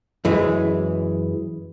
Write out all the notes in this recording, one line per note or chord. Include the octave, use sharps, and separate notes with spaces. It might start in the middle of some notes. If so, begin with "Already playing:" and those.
F#2 E3 G#3